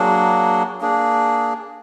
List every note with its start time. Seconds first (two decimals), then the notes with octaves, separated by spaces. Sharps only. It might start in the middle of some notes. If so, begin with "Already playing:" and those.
Already playing: F#3 A#3 D4 G#4
0.81 A#3 D4 G#4